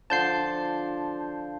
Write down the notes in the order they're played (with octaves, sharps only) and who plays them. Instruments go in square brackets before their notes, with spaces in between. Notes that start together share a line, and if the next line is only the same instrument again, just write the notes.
[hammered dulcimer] D3 F3 [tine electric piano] A5 G6 C7